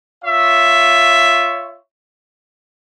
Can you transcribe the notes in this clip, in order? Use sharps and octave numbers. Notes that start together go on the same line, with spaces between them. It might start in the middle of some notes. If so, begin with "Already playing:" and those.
F4 C#5 E5